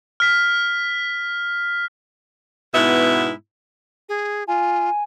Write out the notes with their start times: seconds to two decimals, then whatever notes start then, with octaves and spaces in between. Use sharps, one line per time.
0.20 F6 B6
2.74 G#2 B2 B3 E4 E5
4.09 G#4
4.48 F4 G#5